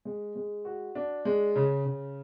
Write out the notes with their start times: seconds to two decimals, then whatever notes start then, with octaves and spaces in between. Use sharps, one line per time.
0.05 G#3
0.36 G#3
0.65 F#4
0.95 D4
1.25 G#3
1.56 C#3
1.86 C#3